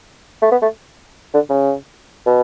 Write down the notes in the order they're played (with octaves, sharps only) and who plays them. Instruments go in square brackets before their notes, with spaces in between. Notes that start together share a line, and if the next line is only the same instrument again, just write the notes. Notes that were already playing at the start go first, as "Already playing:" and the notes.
[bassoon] A3
B3
A3
D3
C#3
B2